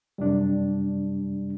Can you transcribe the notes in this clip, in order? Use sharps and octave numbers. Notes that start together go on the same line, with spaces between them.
F#2 C3 G3 D4